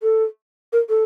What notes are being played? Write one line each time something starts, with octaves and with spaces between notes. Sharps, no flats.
A4
A#4
A4